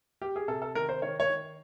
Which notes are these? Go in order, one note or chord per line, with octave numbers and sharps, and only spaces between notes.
G4
G#4
C3 A4
A4
D#3 A#4
C5
D#3 C#5
C#5
D#3